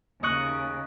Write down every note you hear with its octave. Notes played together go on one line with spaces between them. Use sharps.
D#2 C#3 D#5 C#6 F#6